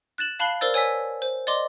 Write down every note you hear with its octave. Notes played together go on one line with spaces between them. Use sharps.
F#6 A6 E7 F#7
F5 A5 B5 F#6 C7 G7
A#4 C5 D5 E6 A6
C#5 G#5 E6 B6
C5
D5 D#5 C6 D6